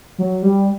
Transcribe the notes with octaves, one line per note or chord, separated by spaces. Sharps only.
F#3
G3